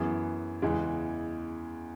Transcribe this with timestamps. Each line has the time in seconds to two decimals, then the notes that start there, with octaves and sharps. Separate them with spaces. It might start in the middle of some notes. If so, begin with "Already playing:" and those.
Already playing: F#2 E3 B3 G#4
0.62 E2 C#3 E3 G#3